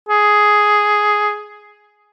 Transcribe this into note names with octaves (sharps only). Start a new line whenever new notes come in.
G#4